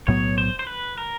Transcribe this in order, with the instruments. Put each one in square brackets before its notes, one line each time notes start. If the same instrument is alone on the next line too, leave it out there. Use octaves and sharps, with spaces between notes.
[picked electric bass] B1 A2 F#3 B3 [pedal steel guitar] C#5
[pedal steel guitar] C5
C5
B4
A#4